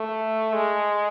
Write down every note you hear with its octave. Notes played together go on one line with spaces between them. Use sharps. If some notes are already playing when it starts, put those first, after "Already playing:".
Already playing: A3
G#3